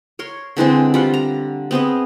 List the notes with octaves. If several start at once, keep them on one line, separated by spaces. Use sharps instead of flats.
A#4 C#5 C6
D3 E3 G#3 C4
G3 F4 F#5
A#5
B3 C4 G#4 D#5